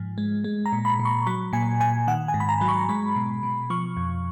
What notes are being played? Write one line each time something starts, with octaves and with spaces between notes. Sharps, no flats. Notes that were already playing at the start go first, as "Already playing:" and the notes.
Already playing: G#2 F3
G#3
G#3
A#5
A#2
B5
A#2
C#6
F#3 B5
A#2 G#5
A#2 G#5
D#3 F#5
G#5
G#2
B5
A#5
F#3
C#6
G#3 B5
B2
B2
F3 C#6
F2